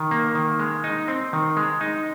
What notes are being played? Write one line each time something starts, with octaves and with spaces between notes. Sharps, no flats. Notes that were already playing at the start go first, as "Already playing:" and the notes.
Already playing: D#3
A#3
D#3
G#3
D#4
C4
D#3
G#3
D#4